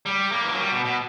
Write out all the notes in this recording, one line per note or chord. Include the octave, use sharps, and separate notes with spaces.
G3
A#3
E3
F#3
G3
B2
B2